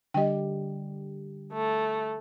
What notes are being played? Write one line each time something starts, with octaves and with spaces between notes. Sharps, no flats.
D3 G3 G4 D#5 G5
A3